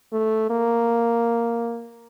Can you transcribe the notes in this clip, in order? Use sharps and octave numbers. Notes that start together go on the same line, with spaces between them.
A3
A#3